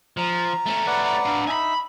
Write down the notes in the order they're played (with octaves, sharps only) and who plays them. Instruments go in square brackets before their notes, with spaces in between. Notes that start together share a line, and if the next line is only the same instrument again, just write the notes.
[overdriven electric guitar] F3 [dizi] A#5
[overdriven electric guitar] A3 C#4
[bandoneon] B4 D5 F#5
[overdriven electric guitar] D4 F5
[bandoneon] D#4 E5 [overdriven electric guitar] G#5 B5